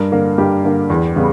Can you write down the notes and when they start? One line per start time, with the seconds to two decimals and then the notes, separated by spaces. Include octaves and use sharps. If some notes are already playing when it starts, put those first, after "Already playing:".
Already playing: G2 A#4
0.12 D3 A#3
0.38 G2 G4
0.64 D3 A#3
0.90 E2
1.16 C#3 G3 B3